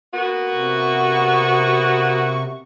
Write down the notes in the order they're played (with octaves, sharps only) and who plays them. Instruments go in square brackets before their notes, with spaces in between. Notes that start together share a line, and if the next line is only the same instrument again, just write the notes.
[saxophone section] A#3 B3 F#4
[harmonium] C3 [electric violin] C#6